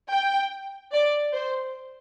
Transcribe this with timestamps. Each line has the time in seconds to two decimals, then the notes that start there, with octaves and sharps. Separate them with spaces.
0.11 G5
0.93 D5
1.34 C5